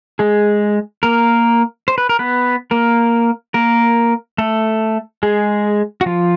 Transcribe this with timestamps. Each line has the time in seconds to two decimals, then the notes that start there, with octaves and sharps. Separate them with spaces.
0.19 G#3 G#4
1.03 A#3 A#4
1.88 C5
1.98 B4
2.09 A#4
2.19 B3 B4
2.71 A#3 A#4
3.54 A#3 A#4
4.38 A3 A4
5.23 G#3 G#4
6.01 F#4
6.06 F3 F4